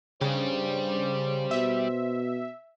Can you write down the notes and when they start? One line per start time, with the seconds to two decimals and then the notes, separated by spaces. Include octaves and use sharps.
0.21 G2 C#3 G3 G4 C5
1.51 B2 E5